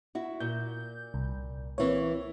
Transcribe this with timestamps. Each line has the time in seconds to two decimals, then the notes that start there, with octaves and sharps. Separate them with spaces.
0.15 E4 F#4
0.40 A#2 G6
1.14 C2
1.78 E3 A#3 C4 E4 C#5